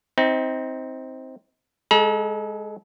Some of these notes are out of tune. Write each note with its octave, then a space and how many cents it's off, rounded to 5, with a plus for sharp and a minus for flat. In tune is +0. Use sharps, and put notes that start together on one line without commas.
C4 +0 D#4 +35
G#3 +0 A4 -30 A#5 +45